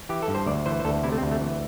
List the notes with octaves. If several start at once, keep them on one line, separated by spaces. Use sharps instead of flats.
E3 G4
A4
G2
C5
D2 D5
E3 C5
C5
D2 A4
C3 E4
A3
C4
D2
A3
E3